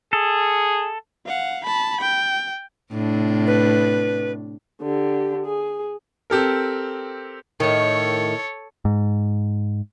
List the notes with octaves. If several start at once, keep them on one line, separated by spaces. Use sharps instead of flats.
G#4 A4
F5 F#5
A5 B5
G5
A2 C3 D4
B4
D3 G4
G#4
C4 G4 A4 A#4
A2 D#3 A4 C#5
G#2